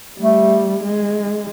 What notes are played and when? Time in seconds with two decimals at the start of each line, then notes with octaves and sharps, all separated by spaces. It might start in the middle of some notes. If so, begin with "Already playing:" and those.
0.20 G3 A3
0.84 G#3